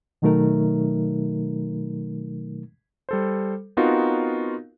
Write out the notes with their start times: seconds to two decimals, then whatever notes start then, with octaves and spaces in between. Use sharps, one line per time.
0.22 B2 D#3 F#3 A3 D#4 A#4
3.09 G3 A4 C5
3.77 B3 C4 D#4 F4 F#4 A#4